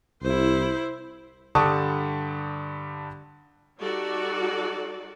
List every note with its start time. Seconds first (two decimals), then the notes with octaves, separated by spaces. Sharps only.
0.23 C2 E4 C5
1.55 G2 D3 G3 A5 C#6 D#6
3.80 G3 D#4 F#4 A4 D5